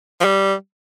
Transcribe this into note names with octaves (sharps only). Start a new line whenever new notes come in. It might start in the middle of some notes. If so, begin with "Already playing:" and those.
F3
G3